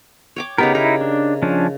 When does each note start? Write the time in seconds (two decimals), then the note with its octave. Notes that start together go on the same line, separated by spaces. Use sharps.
0.36 C#5 G5 D6
0.58 C#3 B3 D#4 G4 A#4
0.75 D#4 E4 A#4
1.01 D4
1.42 F3 C#4 D4